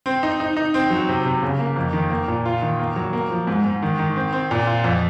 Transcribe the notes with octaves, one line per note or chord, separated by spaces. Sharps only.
C4
D#4
D#4
D#4
C4
F#3
C3
C3
C#3
A#3
F2
D#3
A#3
A#2
F4
D#3
A#3
F#3
A#3
F3
G#2
G#2
D#3
D#3
C4
C4
A#2
F4
F2